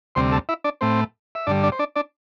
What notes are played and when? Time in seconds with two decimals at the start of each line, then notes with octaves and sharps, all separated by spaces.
0.15 D2 C3 G3 C4 C5 C6
0.32 A4 A5
0.49 E4 E5
0.64 D4 D5
0.81 A2 A3 C4 C5
1.35 E5
1.47 G2 D3 G3 D4 D5
1.63 D4 D5
1.72 C5
1.79 D4 D5
1.96 D4 D5